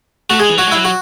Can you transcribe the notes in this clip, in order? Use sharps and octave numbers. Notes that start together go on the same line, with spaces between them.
A3 F#4
G#3 G#4
E3
F#3 F#4
G#3
F#3 E4
F#4